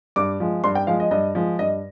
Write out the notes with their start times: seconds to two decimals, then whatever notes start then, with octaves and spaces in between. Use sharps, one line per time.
0.16 G2 D6
0.40 F3 G#3
0.64 G2 C6
0.75 G5
0.87 F3 G#3 F5
1.00 D#5
1.11 G2 D#5
1.35 F3 G#3
1.59 G2 D#5